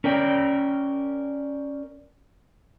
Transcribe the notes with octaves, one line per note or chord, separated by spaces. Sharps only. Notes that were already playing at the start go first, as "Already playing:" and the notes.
C#4 A#4 D5 G5